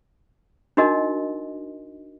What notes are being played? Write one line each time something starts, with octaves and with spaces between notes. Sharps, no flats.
D4 D#4 F#4 A#4 D#5